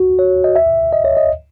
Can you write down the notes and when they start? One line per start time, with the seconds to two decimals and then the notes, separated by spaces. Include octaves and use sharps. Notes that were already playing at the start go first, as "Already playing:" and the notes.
Already playing: F#4
0.19 C#5
0.44 D#5
0.56 E5
0.93 D#5
1.04 C#5
1.17 D#5